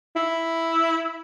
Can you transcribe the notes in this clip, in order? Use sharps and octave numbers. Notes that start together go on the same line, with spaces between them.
E4